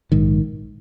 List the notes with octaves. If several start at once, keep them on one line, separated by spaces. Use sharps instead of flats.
A#1 G#2 D#3